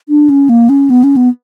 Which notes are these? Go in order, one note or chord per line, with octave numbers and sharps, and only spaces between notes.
D4
C#4
A#3
C#4
B3
C#4
B3